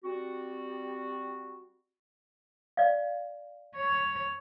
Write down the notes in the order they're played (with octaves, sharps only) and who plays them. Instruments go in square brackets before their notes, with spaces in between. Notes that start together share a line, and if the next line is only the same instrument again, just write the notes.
[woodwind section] G3 C4 F#4
[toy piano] D5 F5
[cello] C#5